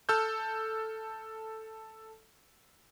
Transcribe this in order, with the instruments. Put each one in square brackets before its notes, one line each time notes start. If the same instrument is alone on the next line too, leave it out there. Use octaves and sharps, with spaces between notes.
[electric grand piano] A4 A5 E6 F6 G6